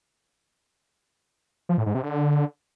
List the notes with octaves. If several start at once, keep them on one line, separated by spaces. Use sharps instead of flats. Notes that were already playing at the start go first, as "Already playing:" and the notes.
F3
A2
G#2
C3
D3